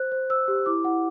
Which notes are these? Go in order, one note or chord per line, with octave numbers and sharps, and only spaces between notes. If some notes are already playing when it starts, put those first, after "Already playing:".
Already playing: C5 F#6
C5
C5 E6
G4
E4 D6
E4 F#5